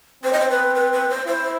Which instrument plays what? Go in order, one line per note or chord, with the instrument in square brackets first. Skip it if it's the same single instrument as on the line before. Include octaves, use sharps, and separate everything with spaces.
[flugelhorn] C4 [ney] C5
[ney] D#5
C5
B4
B4
B4
C5
[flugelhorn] E4 [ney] C5